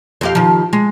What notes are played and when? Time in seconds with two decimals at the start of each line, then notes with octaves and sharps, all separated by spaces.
0.21 F2 G4 F5
0.35 D#3 F3
0.73 G#3